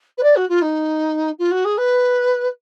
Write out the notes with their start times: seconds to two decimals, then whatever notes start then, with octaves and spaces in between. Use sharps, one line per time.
0.17 B4
0.23 D5
0.36 F#4
0.49 F4
0.62 D#4
1.39 F4
1.51 F#4
1.65 G#4
1.78 B4